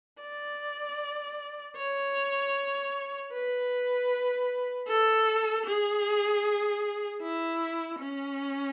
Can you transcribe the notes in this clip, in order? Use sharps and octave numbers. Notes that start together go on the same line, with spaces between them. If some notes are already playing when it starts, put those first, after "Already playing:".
D5
C#5
B4
A4
G#4
E4
C#4